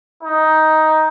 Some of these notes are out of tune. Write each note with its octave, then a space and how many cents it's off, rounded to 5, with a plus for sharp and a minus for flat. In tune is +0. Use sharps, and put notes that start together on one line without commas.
D#4 +10